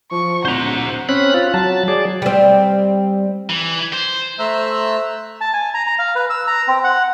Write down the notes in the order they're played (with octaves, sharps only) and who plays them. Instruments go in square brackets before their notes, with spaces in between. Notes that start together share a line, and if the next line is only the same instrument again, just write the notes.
[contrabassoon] F3 [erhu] C#6
[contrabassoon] D1 [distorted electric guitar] C5 A#5 [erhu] F#5
[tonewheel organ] C4 C#4 B5 F#6
F4
F#3 A5
F#3 G#4 D5
[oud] G3 C4
[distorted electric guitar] E3
C5
[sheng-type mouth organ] A3 C5 E5 A#5 E6 F#6
[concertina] A5
G#5
A#5
A#5
F5
B4
E6
A#5
C4
F#5